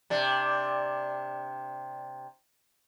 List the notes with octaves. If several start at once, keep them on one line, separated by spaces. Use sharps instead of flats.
C3 D4